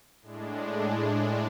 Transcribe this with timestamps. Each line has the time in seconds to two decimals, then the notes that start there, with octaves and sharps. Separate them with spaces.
0.21 A2 G#3 D4